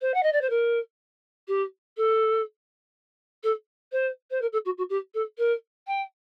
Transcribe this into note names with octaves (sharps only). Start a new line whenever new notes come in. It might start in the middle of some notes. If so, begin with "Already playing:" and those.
C5
F#5
D#5
D5
C5
A#4
G4
A4
A4
C5
C5
A#4
A4
F#4
F#4
G4
A4
A#4
G5